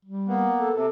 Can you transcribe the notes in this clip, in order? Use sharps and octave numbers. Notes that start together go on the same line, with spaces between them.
G3
A#3 B3
A4
C3 A4